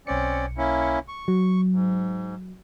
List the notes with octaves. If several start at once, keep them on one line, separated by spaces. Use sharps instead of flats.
B1 C4 C#4 D5 C#7
A#3 C#4 E4
C#6
F#3
G#2